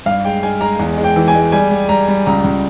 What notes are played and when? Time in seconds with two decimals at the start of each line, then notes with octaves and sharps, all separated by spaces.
0.06 G2 F5
0.24 G#3 G5
0.43 G#3 G#5
0.61 G#3 A#5
0.79 E2
0.98 G#3
1.04 G5
1.16 E3
1.28 G#5
1.34 G#3
1.52 G3 G#5
1.71 G3
1.89 G3 A#5
2.08 G3
2.26 C#2 A#5
2.44 C#2